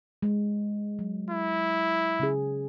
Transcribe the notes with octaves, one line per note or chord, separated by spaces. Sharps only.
G#3
F#3
E4
C#3 C#4 G#4